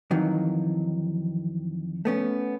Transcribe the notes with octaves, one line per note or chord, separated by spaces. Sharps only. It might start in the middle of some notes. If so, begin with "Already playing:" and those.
F2 D#3 E3 F#3
A3 B3 C#4